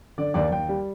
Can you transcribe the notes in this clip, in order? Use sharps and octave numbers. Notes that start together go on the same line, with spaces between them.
D3 D5
D#2 D5
D#2 G5
G3